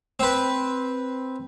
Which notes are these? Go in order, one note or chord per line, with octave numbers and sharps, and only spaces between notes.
C4 B4